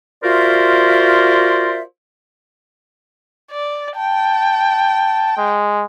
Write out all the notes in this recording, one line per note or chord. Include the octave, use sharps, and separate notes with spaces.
F4 F#4 A#4 C5 D5 E5
D5
G5 A5
G#3